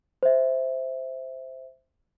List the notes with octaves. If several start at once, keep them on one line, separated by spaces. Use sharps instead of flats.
C5 E5